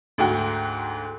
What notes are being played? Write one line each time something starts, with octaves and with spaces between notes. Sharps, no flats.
D2 G#2 F#4 G5 F#6